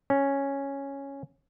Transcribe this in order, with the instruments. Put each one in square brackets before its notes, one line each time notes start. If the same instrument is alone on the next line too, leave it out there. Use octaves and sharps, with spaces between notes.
[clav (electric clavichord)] C#4